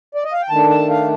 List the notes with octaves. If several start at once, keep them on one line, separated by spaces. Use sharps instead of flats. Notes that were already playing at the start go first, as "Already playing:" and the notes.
D5
D#5
F5
G5
D#3 A3 D4 A5
A5
F5